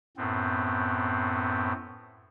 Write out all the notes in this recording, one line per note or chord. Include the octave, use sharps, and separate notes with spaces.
F#2 A2 B3 C4